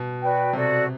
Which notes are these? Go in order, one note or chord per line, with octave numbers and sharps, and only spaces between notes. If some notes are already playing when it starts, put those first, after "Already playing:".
Already playing: B2
F#4 B4 D5 G5
C3 F#4 A4 D5